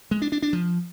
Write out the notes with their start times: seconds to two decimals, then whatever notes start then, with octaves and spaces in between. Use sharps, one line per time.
0.11 G#3
0.22 D4
0.32 D4
0.42 D4
0.53 F3